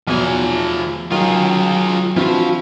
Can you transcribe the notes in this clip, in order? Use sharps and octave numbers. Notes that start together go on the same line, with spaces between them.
E2 B2 F3 F#3 G#5
D#3 F#3 F4 G#4 A#5
E3 F3 C4 D4 E4 F#4